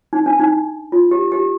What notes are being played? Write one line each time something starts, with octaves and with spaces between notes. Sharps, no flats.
D#4
D4
D#4
F4
G4
G4